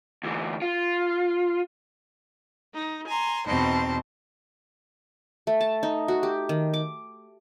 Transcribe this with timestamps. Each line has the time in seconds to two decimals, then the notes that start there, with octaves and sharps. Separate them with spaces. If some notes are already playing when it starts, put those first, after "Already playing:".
0.23 D2 E3
0.62 F4
2.74 D#4
3.07 G#5 A#5 C6
3.46 E2 B2 C4 D#4 C5 A5
5.47 A3
5.61 A5
5.83 D#4
6.08 F#4
6.23 G4
6.49 D#3
6.74 D6